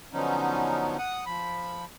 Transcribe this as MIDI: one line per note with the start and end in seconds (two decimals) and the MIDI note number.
0.13 0.97 50
0.13 0.97 53
0.13 0.97 54
0.13 0.97 59
0.13 0.97 61
0.13 0.97 63
0.98 1.25 78
0.98 1.25 87
1.26 1.85 53
1.26 1.85 83